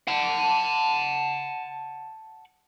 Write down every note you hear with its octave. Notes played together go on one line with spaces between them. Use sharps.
F#5 A5